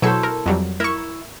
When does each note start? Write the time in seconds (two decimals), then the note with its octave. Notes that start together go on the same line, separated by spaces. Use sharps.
0.02 B2 F#3 E4 A4 C5 C#6
0.23 A#4
0.46 F2 F#3 G3
0.80 E4 A#4 C#6